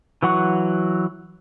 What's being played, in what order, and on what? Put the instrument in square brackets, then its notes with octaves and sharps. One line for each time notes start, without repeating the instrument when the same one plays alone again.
[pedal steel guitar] E3 F#3 F#5 C#6